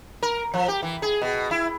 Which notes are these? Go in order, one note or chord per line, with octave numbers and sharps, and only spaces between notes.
A#4
F3
G4
E3
G#4
B2
E4